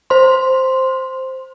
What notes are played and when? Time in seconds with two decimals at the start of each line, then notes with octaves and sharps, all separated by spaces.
0.10 C5 C6